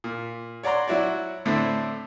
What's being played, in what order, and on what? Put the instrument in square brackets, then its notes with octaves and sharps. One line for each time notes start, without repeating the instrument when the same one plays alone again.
[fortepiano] A#2
C#5 D5 F#5 A#5 C6
F#3 E4 F#4 C#5 D5
A2 D3 A3 C4 D4 E4